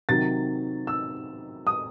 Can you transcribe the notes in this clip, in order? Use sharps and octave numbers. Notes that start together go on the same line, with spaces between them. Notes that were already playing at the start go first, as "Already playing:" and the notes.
C3 D#3 F#3 A6
E6
D#6